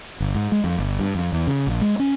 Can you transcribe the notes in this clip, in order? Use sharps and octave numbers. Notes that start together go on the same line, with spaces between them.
G1
G#2
G#3
F2
G1
G2
F2
E2
C#3
A#1
G#3
C#4